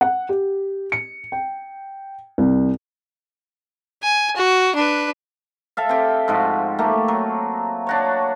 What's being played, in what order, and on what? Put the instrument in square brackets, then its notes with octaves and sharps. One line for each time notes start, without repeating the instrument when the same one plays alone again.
[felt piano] F#5
G4
C#7
G5
C2
[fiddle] G#5
F#4
D4 B4
[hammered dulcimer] A4 E5 F5
C4 G4
G#2 F3 F#4
A3 A#3 G4
F#3
D4 F#4 C#5